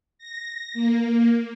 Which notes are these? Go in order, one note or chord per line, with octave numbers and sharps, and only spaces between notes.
A#6
A#3